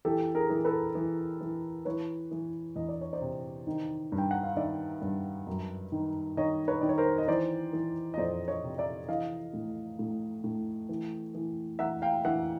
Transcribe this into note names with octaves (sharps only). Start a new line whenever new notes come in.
E3 G4 A4
G#4 A#4
E3
A4 B4
E3
E3
E3 B4 C#5
E3
E2 D#5
D5
C#5
C5 D5
C3
D#3
G2
G5
F#5
F5
D#3 D5 E5
G2
F#2
D#3
D#3 C#5 D#5
B4 C#5
D#3 D5
C#5
A#4 C5
D#5
E3 C5 D5
E3
D#5
F2 C5 D5
C#5 D#5
C3
D5 E5
E3 D#5 F5
A2
A2
A2
E3
E3
E3 E5 F#5
F5 G5
E3 E5 F#5